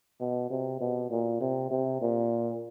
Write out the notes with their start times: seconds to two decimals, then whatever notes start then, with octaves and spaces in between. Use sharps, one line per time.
0.21 B2
0.50 C3
0.80 B2
1.11 A#2
1.41 C3
1.71 C3
2.02 A#2